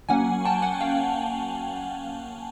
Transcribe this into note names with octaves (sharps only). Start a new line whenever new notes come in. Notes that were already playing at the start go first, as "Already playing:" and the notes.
F#3 A#3 C#4 F#5 G#5
G5 A5
F#5 G#5
F5 G5